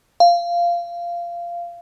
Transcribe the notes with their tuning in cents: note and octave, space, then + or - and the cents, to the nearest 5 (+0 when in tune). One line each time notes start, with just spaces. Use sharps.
F5 -15